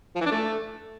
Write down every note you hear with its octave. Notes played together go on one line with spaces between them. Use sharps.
F3
E3
D4
A3